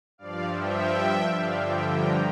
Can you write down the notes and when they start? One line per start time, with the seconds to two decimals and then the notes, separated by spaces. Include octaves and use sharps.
0.18 G2 F3 D5 F5
0.46 E5 G5
1.30 G2 D3 F3 D5 F5
1.58 E5 G5
1.86 G5 A#5